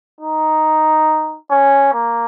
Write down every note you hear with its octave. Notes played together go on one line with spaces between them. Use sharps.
D#4
C#4
A#3